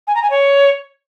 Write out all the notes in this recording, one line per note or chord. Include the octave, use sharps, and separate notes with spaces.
G#5
A#5
G#5
C#5